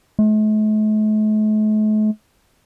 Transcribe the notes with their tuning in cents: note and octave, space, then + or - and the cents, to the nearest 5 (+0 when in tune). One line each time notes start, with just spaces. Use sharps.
A3 -45